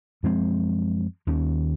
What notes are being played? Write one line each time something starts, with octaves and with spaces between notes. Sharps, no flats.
F#2 F3 G#3 C4
D#2 D#3 A#3 C#4